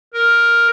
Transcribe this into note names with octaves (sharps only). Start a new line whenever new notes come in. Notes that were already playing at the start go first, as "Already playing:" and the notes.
A#4